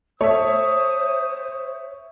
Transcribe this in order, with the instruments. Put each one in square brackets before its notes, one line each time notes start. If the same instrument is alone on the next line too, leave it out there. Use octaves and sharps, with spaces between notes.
[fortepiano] A3 [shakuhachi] C5 [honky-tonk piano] C#5 E5 [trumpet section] D#6